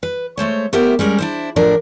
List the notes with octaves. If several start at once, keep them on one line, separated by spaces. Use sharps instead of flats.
B4
G#3 A3 C5 C#5
A3 B3 E4 G4 A#4 C5
G3 G#3 C#4 A#4
D4 E4 C5
A2 D3 F3 D4 A#4